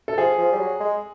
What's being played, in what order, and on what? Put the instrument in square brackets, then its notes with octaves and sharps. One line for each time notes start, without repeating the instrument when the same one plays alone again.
[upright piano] A4
[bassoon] F3 [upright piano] G#4
[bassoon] F3
G3
F#3
G#3